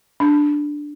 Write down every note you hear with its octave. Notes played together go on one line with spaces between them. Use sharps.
D4